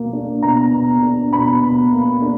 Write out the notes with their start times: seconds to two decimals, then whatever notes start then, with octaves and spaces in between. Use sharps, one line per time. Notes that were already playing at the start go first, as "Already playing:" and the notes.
Already playing: B2 A#3
0.13 D4
0.43 B2 A#5
0.73 B2
1.02 D4
1.33 B2 B5
1.62 B2
1.92 A#3
2.22 D4